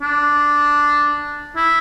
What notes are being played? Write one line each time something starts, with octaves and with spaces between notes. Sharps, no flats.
D4
E4